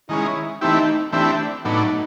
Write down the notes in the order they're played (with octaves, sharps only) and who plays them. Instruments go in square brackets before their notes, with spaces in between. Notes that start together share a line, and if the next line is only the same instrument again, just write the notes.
[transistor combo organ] D#3 G#3 C#4 [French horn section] E4
[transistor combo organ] E3 A3 C4 E4 G4 [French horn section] D#4
[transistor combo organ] E3 A3 C4 E4 G4 [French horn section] D4
[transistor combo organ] A2 F#3 B3 D4 [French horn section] D#4